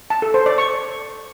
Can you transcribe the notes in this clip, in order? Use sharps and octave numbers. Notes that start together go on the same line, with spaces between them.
A5
A4
C5
D5
C#6